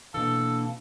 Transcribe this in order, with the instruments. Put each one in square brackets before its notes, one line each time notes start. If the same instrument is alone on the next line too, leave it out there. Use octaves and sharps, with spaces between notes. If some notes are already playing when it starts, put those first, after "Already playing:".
[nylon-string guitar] B2 E3 [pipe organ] A#3 D4 [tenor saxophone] A4